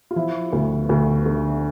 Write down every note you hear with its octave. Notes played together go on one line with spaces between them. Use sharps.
F4
F3 E4
D2
D2
D3